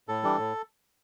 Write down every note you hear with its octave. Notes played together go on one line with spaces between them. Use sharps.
A2 A4
E3 G3 D4
A2